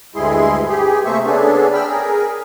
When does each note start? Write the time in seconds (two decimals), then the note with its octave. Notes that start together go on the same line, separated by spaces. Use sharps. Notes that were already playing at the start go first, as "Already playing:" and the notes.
0.15 D2 G2 G#3 E4 G#4 C6
0.69 G4 G#4
1.05 C3 A3 A#3 C5 E5 C#6
1.26 C#3 B3 D4 G#4 A4
1.74 G5 B5 E6 F6
1.89 G#4 A#4